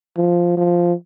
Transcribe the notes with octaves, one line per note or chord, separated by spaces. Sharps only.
F3
F3